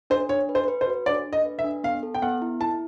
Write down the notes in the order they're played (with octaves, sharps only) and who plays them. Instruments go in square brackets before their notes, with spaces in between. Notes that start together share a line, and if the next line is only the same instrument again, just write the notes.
[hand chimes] D4 [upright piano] C5
[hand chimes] D4 [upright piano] C#5
[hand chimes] B4
[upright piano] C5
[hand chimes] B4
[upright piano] C5
[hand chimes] F#4
[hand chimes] D4 [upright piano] D5
[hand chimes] D4
[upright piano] D#5
[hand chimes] B4
[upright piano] E5
[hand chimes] D4
[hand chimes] B3 [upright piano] F5
[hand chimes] A4
[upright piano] G5
[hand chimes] B3 [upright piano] F#5
[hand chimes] E4
[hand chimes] E4 [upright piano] A5